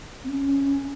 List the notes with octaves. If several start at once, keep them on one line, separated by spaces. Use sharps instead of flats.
C4
C#4